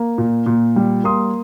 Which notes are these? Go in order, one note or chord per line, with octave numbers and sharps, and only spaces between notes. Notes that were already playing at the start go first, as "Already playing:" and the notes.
Already playing: A#3
A#2
A#2
G3
A#3 C6 D#6